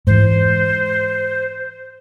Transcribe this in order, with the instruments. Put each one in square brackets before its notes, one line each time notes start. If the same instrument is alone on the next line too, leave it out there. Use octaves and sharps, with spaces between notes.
[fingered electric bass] G#2 E3 [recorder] C5